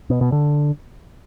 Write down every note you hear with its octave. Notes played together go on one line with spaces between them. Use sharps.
B2
B2
D3